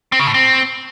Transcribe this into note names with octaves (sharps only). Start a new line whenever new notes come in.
C4
C#3
A2
C4